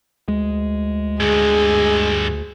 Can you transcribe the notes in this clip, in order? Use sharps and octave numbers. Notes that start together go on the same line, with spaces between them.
D2 G#3
G2 D3 G#4